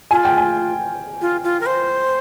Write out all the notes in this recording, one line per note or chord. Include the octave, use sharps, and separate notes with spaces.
F4 G#5
G5
G#5
F4
F4
A#4
C5